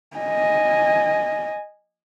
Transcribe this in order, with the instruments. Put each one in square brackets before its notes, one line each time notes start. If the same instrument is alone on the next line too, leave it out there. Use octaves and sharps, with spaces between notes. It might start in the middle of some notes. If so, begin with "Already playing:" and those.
[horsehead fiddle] D#5 G#5